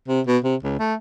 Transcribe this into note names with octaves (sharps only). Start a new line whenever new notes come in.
C3
B2
C3
C#2
A3